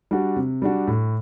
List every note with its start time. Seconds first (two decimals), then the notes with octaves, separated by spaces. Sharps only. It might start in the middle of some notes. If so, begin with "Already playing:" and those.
0.11 G3 D4 F#4
0.36 C3
0.62 G3 D4 F#4
0.88 A2